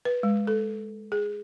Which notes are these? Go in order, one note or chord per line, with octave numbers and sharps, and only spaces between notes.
B4
G#3
A4
G#4